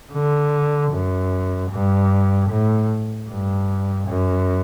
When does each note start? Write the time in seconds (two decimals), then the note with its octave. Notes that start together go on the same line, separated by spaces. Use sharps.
0.12 D3
0.91 F#2
1.71 G2
2.50 A2
3.29 G2
4.08 F#2